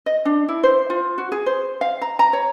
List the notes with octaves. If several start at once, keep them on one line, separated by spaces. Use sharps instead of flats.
D#5
D4
E4
C5
F4
F#4
G#4
C5
F5
A#5
A#5
C#5